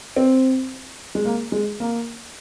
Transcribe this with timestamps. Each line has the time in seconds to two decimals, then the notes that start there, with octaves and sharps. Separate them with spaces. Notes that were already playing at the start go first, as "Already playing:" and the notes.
0.16 C4
1.15 G#3
1.25 A#3
1.52 G#3
1.80 A#3